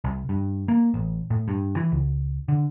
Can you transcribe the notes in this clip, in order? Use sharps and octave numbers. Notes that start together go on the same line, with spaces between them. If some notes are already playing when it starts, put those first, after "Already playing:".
C2
G2
A#3
A1
A2
G2
E3
C#2
D3